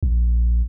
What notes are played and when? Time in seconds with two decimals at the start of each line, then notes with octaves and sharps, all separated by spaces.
0.03 A#1